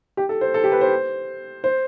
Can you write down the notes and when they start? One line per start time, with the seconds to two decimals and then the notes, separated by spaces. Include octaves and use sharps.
0.17 G4
0.29 A4
0.41 C5
0.54 A4
0.64 G4
0.72 B4
0.81 C5
1.64 C5